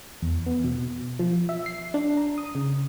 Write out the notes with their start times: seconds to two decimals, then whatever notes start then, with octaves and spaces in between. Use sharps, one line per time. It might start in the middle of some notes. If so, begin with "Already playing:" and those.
0.22 E2
0.46 B3
0.64 B2
1.19 F3
1.49 E5
1.66 C7
1.94 D4
2.17 A#5
2.38 D#6
2.55 C#3